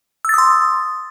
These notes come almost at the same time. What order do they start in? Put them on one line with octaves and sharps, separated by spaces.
E6 A6 D#6 C6